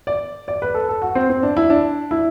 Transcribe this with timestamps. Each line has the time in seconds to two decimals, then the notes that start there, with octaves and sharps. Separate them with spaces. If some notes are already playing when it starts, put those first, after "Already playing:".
0.07 D5
0.48 D5
0.62 B4
0.74 A4
0.89 A4
1.02 F#4
1.15 C4
1.30 C4
1.43 D4
1.57 E4
1.70 D4
2.11 E4